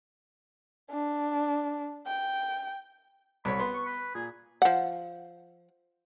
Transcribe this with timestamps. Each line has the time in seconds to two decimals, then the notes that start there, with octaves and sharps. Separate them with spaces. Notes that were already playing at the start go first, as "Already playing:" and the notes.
0.90 D4
2.07 G5
3.45 C2 C#5 B5
3.59 B3 C6
3.74 C#6
3.86 B4
4.15 A#2 G#4
4.62 F3 F#5